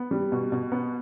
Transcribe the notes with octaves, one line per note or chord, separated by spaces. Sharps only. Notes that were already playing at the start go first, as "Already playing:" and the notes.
Already playing: B3
G3
B2
B2
B3